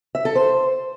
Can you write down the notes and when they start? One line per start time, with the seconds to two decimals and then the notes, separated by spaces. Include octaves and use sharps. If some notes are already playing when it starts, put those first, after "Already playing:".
0.15 E5
0.25 A4
0.36 C5